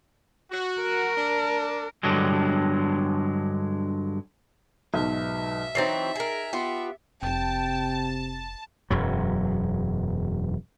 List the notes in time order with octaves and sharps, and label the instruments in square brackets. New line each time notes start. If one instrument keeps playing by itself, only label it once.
[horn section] F#4
[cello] A#4
[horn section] D4
[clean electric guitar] G2 D3 F#3 G#3
[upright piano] B1 G#2 B2 [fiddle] E5
[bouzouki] E3 F#3 C4 [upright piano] D#4 A6 C7
[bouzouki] G#4 A#4
B3 F4 G4
[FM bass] F1 [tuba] C3 [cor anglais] G5 [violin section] A5
[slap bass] E1 F#2 F#3